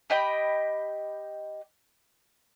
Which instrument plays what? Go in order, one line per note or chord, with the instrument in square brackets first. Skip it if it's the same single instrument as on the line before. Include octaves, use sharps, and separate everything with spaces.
[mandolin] G4 D#5 G5 B5